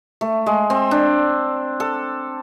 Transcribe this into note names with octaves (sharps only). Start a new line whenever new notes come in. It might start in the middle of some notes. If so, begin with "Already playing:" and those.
A3
G#3
C4
D4
A4